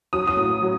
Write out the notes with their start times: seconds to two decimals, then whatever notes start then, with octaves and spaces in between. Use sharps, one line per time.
0.13 F#3 D#6
0.27 D#6
0.37 A2
0.62 F#3